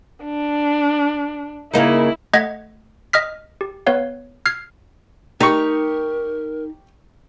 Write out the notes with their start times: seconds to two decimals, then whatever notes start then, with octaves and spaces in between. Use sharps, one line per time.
0.24 D4
1.74 C#3 A#3 D#4 E4
2.33 A3 D#5 F#5 G#6 B6
3.13 D#5 D#6 F6 B6
3.61 G4
3.87 B3 B4 C#5 F5
4.46 F6 G#6 C7
5.41 D#4 G4 A#4 C#6